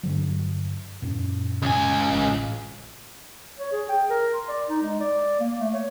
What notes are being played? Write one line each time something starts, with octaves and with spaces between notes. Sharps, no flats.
G2 D3 F#3
F#2 A#2
C#2 G#5
A1
C#5
G#4
G5
A#4
C6
D5
D#4
G#3
D5
A#3
A3
C#5